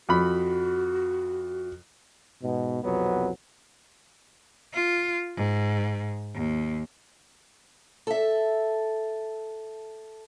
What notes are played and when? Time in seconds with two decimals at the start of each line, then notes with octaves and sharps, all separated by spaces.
0.09 F2 F#4 B5
2.43 G#2 B2
2.83 C2 F2 B2 F#3 B3
4.74 F4
5.37 G#2
6.35 D#2
8.07 A4 E5